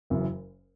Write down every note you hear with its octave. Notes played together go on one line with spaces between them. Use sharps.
F#1 F#2 C#3 E3